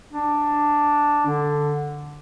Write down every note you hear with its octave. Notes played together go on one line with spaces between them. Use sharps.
D4
D3